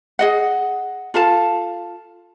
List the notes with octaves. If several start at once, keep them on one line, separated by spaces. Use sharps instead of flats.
G#4 D#5 F#5
F4 A4 F5 A5